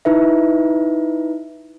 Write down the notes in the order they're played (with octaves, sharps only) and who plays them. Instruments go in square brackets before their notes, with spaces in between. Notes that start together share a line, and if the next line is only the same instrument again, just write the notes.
[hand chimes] D#4 E4 B4 E5